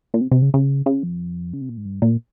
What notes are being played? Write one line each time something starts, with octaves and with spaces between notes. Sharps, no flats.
A#2
C3
C3
C#3
C#3
C#3
F2
C#3
C3
A#2
G#2
G2
A#2